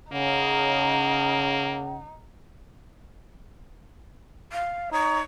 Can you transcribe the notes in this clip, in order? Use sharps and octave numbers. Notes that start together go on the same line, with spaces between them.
C#3 A#3 D#4 F#5
F5
D#4 C#5